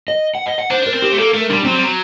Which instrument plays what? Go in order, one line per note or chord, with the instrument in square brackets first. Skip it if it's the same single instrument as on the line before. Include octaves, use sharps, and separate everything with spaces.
[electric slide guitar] D#5
F#5
D#5
F#5
[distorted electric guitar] D4 [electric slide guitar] C5
[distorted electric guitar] D4 [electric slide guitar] A#4
[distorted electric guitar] C4
[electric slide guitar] G4
[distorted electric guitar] A3
[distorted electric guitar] A#3 [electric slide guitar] A4
[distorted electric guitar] A3 [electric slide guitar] A#4
[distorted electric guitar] G3 [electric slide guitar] D4
[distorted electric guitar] F#3 [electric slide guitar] C4
[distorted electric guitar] G3
F#3